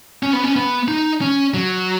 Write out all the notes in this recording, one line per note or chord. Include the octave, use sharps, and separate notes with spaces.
C#4
B3
C#4
B3
D#4
C#4
F#3